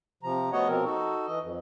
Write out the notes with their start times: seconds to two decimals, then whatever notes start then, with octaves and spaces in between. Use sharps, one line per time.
0.23 C3 F3 A#5
0.52 A3 B3 F#4 C#5 D#5 F#5
0.68 B2 F3 C4 A#4
0.85 D#4 F#4 A4
1.26 E3 D#5
1.42 F2